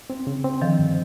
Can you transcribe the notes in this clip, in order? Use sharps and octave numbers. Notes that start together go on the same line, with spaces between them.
C4
C#3
C4
D3 D#3 F3
G2